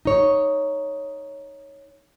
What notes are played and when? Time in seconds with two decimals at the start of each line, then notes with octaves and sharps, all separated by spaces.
0.05 D#4 C#5